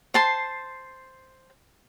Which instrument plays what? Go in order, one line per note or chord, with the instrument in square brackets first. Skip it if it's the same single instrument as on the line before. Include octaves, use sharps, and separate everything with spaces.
[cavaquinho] C5 A5 C6